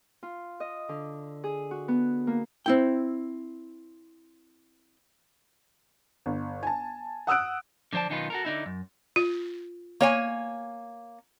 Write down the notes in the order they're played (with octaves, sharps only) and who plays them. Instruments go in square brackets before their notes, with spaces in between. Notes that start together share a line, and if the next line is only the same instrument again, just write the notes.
[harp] F4
D#5
D3
G#4
F#4
B3
A#3
[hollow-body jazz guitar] C4 E4 G5
[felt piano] G1
G#5 A5
F#5 D#6 E6 F#6 D7
[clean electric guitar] D3 F3 C5 D5 A5
B1 D#3 C#4 D#4 F4 B4
F#4 A4 A#4
D3 D#4 E4
F#2
[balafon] F4
[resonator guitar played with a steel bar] A#3 C#5 G#5